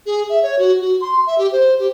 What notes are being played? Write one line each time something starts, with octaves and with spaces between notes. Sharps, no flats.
G#4
E5
C#5
F#4
F#4
C6
E5
G4
C5
G4